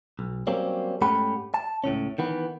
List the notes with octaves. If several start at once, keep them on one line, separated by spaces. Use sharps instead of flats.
B1
F#3 G3 A#3 C4 C#4
G#2 A3 C#4 G4 F#5 B5
A5
C#2 A2 C3 C#4
D#3 E3 B3